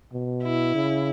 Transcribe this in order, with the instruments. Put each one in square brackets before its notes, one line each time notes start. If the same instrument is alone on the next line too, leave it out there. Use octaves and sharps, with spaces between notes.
[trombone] B2
[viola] E4
[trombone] C#3